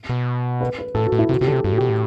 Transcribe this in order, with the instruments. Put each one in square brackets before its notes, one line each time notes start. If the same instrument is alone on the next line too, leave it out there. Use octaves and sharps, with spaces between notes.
[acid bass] B2
[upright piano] B4
B4
[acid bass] A2 [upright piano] A4
[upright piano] F#4
[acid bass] A2
[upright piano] E4
[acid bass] C3 [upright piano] F#4
[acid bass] C3 [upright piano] G4
[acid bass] D3 [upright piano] A4
[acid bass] C3
[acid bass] G2 [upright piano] F#4
[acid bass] A2
[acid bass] B2 [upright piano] G4
[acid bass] A2